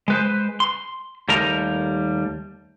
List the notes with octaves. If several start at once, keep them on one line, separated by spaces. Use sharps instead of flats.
G#3 B4 C5
C6
D#2 G3 A3 A#4 D#5 A#5